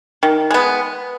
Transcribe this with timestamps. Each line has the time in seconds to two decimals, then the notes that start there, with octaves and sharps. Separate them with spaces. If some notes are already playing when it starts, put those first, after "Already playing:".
0.23 D#3
0.51 G#3 B3